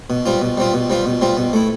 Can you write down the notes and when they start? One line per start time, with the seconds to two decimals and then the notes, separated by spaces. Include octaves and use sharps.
0.10 B2
0.26 G3 C4 F4
0.42 B2
0.57 G3 C4 F4
0.73 B2
0.90 G3 C4 F4
1.05 B2
1.21 G3 C4 F4
1.37 B2
1.53 A3 E4